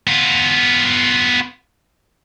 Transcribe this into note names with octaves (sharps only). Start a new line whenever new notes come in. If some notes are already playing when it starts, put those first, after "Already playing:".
B3 F4